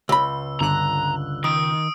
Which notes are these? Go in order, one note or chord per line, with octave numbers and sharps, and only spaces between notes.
C#2 B5 E6
G1 D3 A#5 F#6
D#3 D#6 D7